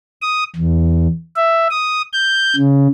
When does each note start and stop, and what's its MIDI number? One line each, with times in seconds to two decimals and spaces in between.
0.21 0.43 87
0.55 1.07 40
1.36 1.67 76
1.70 2.01 87
2.13 2.56 91
2.56 2.87 49